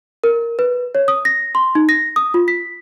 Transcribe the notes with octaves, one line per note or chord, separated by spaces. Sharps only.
A#4
B4
C#5
D#6
A#6
C6
D#4
A#6
D#6
F4
B6